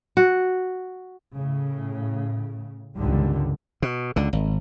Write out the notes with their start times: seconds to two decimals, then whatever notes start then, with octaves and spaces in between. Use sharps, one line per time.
0.17 F#4
1.33 A2 C#3
2.96 G1 C#2 D3 D#3 G3
3.82 B2
4.16 C#2 D3
4.33 G#1